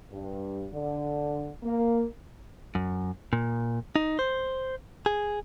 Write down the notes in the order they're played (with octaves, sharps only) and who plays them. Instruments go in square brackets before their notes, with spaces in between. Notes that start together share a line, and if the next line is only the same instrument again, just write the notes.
[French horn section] G2
D3
A#3
[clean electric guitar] F#2
A#2
D#4
C5
G#4